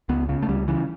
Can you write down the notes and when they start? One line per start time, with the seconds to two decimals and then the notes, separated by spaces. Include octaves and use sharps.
0.09 C#2 B3
0.29 C#3
0.43 A3
0.49 C#2 G3
0.68 C#3 E3